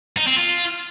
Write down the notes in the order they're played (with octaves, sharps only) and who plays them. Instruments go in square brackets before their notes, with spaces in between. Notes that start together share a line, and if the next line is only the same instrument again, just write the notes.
[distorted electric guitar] D#4
C4
F4